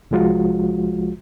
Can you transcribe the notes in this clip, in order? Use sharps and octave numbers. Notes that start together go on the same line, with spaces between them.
C2 F3 G#3 F4 F#4